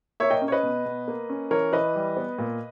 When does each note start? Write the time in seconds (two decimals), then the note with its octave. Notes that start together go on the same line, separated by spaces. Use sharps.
0.20 A#3 C#5 E5
0.30 D#5 G5
0.42 C#4
0.48 C#5
0.52 B4 D#5
0.63 B2
0.86 B2
1.08 A#3
1.29 C#4
1.51 E3 A#4 C#5
1.73 E3 B4 D#5
1.96 G3
2.17 B3
2.38 A#2